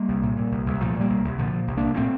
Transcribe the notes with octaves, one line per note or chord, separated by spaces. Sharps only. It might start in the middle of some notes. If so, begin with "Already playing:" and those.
Already playing: G3 A#3
C2
A#2
A#2
C2
C2
A#2 F3 A3
A#2
G3 A#3
C2
C2
A#2 D3 F3
A#2
C2
A#3 D4
C2
A#2 A3 C4